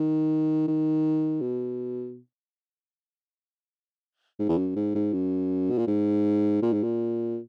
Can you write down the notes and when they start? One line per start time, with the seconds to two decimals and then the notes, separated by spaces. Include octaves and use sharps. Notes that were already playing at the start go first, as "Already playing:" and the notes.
Already playing: D#3
0.68 D#3
1.41 B2
4.39 G#2
4.49 E2
4.58 F#2
4.76 G#2
4.95 G#2
5.13 F#2
5.70 B2
5.78 A#2
5.88 G#2
6.62 A#2
6.73 G#2
6.83 A#2